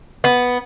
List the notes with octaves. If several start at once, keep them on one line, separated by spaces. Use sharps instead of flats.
B3